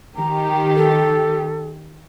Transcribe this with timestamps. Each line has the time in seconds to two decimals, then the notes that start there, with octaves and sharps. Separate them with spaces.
0.16 D#3 G4 A#5
0.76 A4